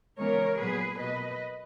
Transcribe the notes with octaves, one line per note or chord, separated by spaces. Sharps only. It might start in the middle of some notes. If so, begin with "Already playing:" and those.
C#3 E3 G#3 B3 A#4 C#5
A#2 F#3 B3 G#4 B4
B2 A#3 B4 D#5